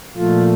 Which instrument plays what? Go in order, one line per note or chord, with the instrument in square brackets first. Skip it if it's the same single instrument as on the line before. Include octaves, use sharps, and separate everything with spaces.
[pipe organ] A#2 F3 A3 F4